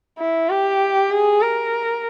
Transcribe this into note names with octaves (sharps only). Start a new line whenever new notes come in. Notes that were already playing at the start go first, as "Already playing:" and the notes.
E4
G4
G#4
A#4